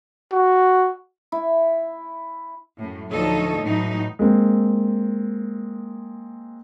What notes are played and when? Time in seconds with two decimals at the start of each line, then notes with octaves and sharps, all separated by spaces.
0.32 F#4
1.32 E4
2.78 F#2 A2
3.10 D2 F3 D#4 A4 C#5 D#5
3.61 A2 E3 F#3 D#4
4.19 G#3 A#3 C4